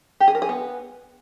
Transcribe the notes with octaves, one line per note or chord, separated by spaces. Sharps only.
G4
G#4
A#4
G#4
B3